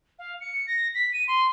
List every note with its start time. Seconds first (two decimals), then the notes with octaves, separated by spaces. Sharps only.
0.19 F5
0.41 C#7
0.67 A#6
0.95 B6
1.13 D#7
1.28 C6